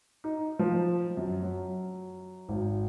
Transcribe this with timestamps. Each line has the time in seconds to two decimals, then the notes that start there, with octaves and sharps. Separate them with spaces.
0.24 D#4
0.59 F3
1.17 F#2
1.43 F#3
2.49 G#1